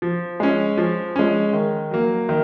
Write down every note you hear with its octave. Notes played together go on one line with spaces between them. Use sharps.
F3
G#3 C#4
F3
G#3 C#4
D#3
F#3 A#3
D#3